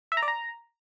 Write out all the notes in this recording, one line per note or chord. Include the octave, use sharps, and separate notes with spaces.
E5
A#5
D5
A#5